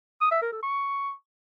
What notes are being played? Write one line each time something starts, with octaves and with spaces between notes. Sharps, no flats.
D#6
E5
A#4
A4
C#6